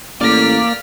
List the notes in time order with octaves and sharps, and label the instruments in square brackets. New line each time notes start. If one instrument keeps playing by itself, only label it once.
[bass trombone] A1 [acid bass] A#3 [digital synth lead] D5 [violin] F6 B6